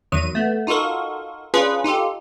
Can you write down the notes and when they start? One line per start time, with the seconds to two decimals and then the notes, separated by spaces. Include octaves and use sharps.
0.12 E2 D#3 F#3 D#7
0.35 A3 B3
0.67 D#4 F4 F#4 A4 A#4
1.54 C#4 D4 F4 G#4 B4
1.84 D#4 F4 G4 A4